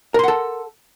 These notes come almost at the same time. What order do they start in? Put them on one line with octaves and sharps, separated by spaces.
A#4 C6 F#5 A4